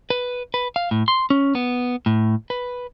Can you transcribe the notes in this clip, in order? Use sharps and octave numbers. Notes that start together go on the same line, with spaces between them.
B4
B4
F5
A2
C6
C#4
B3
A2
B4